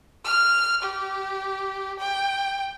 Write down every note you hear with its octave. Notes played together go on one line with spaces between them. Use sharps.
F6
G4
G5